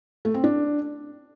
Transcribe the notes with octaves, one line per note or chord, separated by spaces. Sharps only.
A3
C4
D4